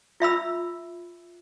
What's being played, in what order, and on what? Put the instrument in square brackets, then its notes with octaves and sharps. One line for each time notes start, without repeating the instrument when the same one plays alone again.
[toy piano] F4 E5 B5 E6